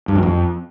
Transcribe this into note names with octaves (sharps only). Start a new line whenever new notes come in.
G2
F#2
F2